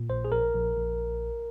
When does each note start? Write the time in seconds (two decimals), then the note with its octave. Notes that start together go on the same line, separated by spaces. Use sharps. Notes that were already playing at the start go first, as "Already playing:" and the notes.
Already playing: A#2
0.09 A#1 C5
0.25 G#4
0.31 A#1 A#4
0.54 A#1
0.77 A#1